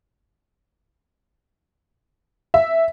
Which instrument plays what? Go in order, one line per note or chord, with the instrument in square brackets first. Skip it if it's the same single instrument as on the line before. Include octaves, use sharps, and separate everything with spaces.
[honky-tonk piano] E5